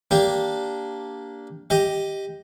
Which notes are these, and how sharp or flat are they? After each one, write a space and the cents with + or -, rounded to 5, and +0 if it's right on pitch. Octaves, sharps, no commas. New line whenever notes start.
A#3 +0 D4 -10 G4 +0
G4 +0 D#5 +5